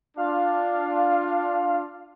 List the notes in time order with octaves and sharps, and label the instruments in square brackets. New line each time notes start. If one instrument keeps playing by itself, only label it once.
[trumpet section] D4 F4 [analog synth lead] F5